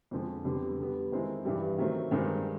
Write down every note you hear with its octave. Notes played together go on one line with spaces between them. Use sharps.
F2 D3 F3 G#3
F2 D3 G3 B3
D3 G3 B3
D#3 G#3 C4 E4
G2 E3 G3
D#3 F#3 A3 C4
G2 D#3 G#3 C4 D#4